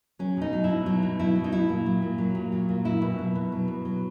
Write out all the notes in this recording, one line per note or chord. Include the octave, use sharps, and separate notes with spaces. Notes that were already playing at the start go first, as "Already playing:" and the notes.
F#3 C#4
B2 D#4
F#3
E4
B2
F#3 D#4
B2
F#3 E4
B2
D#4
F#3 E4
A#2
F#3
A#2
F#3
A#2
F#3
A#2
F#3 E4
B2
F#3
B2
F#3
B2
F#3